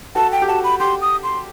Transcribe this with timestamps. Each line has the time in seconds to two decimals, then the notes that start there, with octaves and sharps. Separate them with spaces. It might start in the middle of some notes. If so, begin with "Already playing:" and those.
0.15 F#4 A4 A5
0.32 G5
0.42 G4
0.48 F#4 A5
0.64 B5
0.80 G4 C6
1.01 D#6
1.23 C6